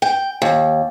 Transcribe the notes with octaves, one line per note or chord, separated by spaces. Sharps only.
G5
D#2